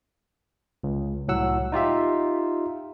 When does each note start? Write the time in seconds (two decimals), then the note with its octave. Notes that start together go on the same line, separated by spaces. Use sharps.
0.84 C#2
1.28 C2 A2 F#3 F#5 E6
1.72 D#4 F4 G4 E5